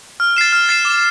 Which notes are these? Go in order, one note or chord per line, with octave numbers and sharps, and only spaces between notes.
F6
A6 C7 E7
F6
A6 C7 E7
D6